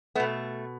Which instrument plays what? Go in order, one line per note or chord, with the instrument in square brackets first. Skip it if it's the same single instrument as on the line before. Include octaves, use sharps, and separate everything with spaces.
[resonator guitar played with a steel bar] B2 A3 B3